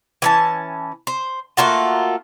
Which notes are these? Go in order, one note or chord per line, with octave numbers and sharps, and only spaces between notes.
E3 C#4 A5
C5
A3 A#3 F4 F#4